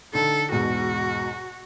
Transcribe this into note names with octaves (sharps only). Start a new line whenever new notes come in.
D3 D#4 A4
E2 G#2 B2 F#4